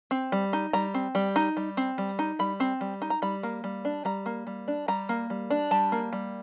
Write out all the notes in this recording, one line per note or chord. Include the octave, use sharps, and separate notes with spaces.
C4
G3
D#4
G3 A#5
C4
G3
D#4
G3
C4
G3
D#4
G3 B5
C4
G3
D#4
A#5
G3 B5
A#3
G3
D4
G3 A#5
A#3
G3
D4
G3 A#5
A#3
G3
D4
G3 A5
A#3
G3